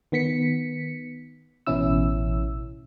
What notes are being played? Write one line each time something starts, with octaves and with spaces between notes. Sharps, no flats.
D#3 B3 B6 C#7
A1 B2 E3 C#4 E4 E6